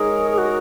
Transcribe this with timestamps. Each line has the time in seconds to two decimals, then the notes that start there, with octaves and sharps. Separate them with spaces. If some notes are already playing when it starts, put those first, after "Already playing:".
Already playing: G#3 D#4 G#4 A#4 C#5
0.31 G#4
0.38 F#4